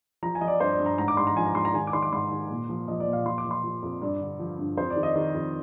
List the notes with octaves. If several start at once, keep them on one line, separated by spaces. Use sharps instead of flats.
F3 A#5
G#5
F3 D#5
D5
G2 C5
D5
G2
A#5
G#2 A#5
D6
G#2 C6
A#5
F3 G#5
A#5
G#2 C6
A#5
D#3 G#5
D6
D#3 C6
D6
G#2 C6
D#3
A#2
F3
F3 D#5
D5
A#2
F5
F3 C6
D6
F3
C6
F3
F2
G2 D5
D3
F3
G2
F2 C5
D5
D#3
D#5
D#3
F2